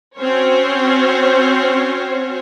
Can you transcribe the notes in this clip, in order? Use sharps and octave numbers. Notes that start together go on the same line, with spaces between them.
C4 C#4 F#4 C5 C#5